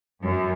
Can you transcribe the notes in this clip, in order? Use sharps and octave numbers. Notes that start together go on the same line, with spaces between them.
F#2